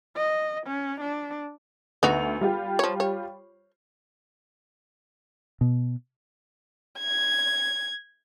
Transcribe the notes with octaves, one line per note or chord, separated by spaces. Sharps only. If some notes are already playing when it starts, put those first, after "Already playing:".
D#5
C#4
D4
D2 B3 D#4 F#4 F7
G3 F4 G4
F3 C#5
C#5
B2
G#6